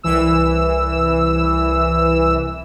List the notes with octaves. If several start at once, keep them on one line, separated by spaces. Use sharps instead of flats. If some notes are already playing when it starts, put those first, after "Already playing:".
C2 E3 E6